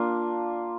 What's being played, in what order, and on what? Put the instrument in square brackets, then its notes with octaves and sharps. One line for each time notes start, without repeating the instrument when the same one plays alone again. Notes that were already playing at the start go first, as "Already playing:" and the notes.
Already playing: [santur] A#3 D4 F4